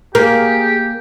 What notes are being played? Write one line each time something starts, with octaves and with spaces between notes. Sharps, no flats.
A#3 G4 G#4